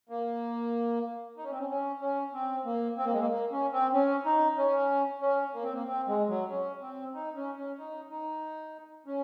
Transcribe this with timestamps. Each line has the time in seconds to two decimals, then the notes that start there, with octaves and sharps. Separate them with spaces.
0.09 A#3
1.37 D#4
1.44 C#4
1.51 C4
1.59 C#4
1.69 C#4
2.01 C#4
2.34 C4
2.65 A#3
2.98 C4
3.05 A#3
3.13 G#3
3.20 A#3
3.30 A#3
3.52 C#4
3.72 C4
3.94 C#4
4.25 D#4
4.58 C#4
5.21 C#4
5.54 A#3
5.64 C4
5.74 A#3
5.87 C4
6.08 G#3
6.29 F#3
6.50 C#4
6.82 C4
7.14 D#4
7.36 C#4
7.57 C#4
7.78 D#4
8.10 D#4
9.06 C#4